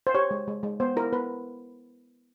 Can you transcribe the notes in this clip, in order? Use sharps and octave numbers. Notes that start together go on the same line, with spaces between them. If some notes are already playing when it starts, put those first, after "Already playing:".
C5
G4 C#5
G#3
G#3
G#3
B3 C5
E4 A#4
B3 B4